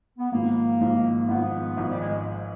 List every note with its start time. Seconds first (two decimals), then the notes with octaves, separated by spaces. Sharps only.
0.18 B3
0.32 G#1 G#2 F3 A#3
0.81 G#1 G#2 F3
1.28 G#1 G#2 F3 B3
1.77 G#1 G#2 F3
1.89 G3
2.01 G#3